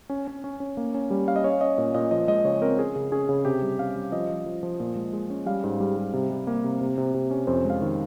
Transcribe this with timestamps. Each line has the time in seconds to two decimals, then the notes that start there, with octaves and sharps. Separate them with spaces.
0.10 C#4
0.27 C#4
0.44 C#4
0.60 C#4
0.77 A#3
0.94 C#4
1.10 G3
1.28 C#4 F5
1.36 D#5
1.44 C#4 C#5
1.61 C#4 D#5
1.78 A#2
1.94 A#2 D#5
2.11 F3 D#5
2.28 G#3 D#5
2.45 C#3 C#5
2.62 C4 A#4
2.78 C#4 G#4
2.96 C#3
3.12 C#4 G#4
3.29 C#3
3.45 C3 G4
3.62 G3
3.79 C#4 F5
3.96 G3
4.12 F3 D#5
4.30 F3
4.46 F3
4.63 F3
4.80 A#2
4.96 G#3
5.13 G#3
5.30 C#4
5.46 G3 F5
5.64 G#2
5.80 G3
5.97 G3
6.13 C3
6.30 G3
6.47 A#3
6.64 C3
6.81 C3
6.98 C3
7.14 C3
7.31 C#4
7.47 F2 C5
7.65 G#3
7.70 F5
7.81 D#3